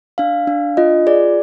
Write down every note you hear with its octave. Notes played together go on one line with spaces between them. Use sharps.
D4 F5
D4
F4 D#5
G#4 D5